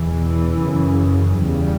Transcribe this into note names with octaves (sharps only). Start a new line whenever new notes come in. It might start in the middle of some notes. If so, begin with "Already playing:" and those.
Already playing: E2 B2 E3
F#2 C#3
E2 C#3 G3